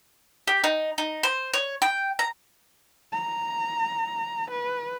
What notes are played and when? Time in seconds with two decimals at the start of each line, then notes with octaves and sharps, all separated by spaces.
0.47 G4
0.64 D#4
0.98 D#4
1.23 C5
1.53 C#5
1.82 G5
2.19 A#5
3.13 A#5
4.51 B4